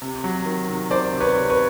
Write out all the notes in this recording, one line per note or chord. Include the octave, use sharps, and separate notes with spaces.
C3
F#3
D#3
C3
D#3 C5 D5
C3
B4 C#5
C3
B4 C#5